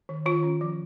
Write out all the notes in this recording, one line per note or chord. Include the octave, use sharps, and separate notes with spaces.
D#3
D#3 F4
C#4
F3